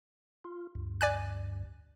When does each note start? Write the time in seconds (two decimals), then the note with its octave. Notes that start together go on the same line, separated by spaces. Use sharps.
0.44 F4
0.75 D2 G2
1.01 D5 G#5 F#6